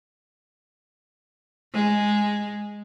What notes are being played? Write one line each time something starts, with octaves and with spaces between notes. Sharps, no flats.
G#3